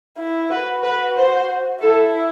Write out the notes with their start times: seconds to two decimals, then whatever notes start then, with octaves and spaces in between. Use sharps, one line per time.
0.18 E4
0.50 F#4 B4
0.83 B4
1.17 C5
1.81 E4 A4